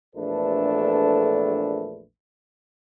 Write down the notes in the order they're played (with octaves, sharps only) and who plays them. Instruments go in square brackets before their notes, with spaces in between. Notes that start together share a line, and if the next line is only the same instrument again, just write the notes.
[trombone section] A#1 E2 A3 D4 A4 B4